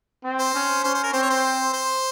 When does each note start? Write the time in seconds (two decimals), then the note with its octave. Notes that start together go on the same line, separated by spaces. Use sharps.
0.24 C4
0.39 C5
0.55 C#4
0.84 C#4 C5
0.94 C5
1.04 A#4
1.14 C4 C5
1.22 C#5
1.30 C5
1.73 C5